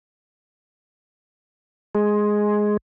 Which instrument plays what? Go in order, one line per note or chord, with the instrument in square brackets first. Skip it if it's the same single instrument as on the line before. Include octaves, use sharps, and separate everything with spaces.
[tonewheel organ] G#3